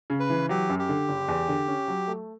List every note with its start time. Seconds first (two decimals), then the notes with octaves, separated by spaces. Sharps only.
0.10 C#3
0.20 B4
0.30 E3
0.49 F#3 G4
0.69 F#2
0.79 G4
0.89 D3
1.09 F#1
1.28 E2
1.48 D3
1.68 C#4
1.88 F#3
2.08 A3